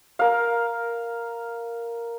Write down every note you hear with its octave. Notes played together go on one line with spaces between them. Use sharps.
A#4 F5